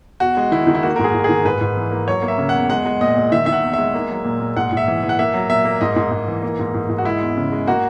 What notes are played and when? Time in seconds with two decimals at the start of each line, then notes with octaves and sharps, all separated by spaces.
0.20 E2 F#4
0.37 G#3
0.52 D#3 E4
0.67 D#3
0.75 E4
0.83 A#3 F#4
0.96 A#4
0.99 G#2 G#4
1.14 G#2
1.24 D#3 G#4
1.45 G#2 B4
1.61 G#2
1.77 E3
1.91 A#3
2.08 F#3 C#5
2.22 A#3
2.28 E5
2.38 C#3
2.49 F#5
2.54 E2
2.70 G#3 F#5
2.86 G#3
3.01 A#2 D#5
3.17 A#2
3.32 D#3 E5
3.46 D#3 E5
3.52 F#5
3.63 E2
3.73 E5
3.79 G#3
3.94 A#3
4.10 F#3
4.25 A#2
4.40 A#2
4.56 G#2 F#5
4.72 G#2 E5
4.88 E3
5.03 E3
5.09 F#5
5.18 A#3 E5
5.34 F#3
5.49 A#2 E5
5.65 A#3
5.81 G#2 D#5
5.96 G#2
6.11 G#2
6.28 E3
6.42 A#3
6.59 G#2
6.74 G#2
6.89 G#2
6.98 F#4
7.05 G#3 E4
7.21 E2
7.37 C#3
7.52 G#3
7.67 A#3 F#4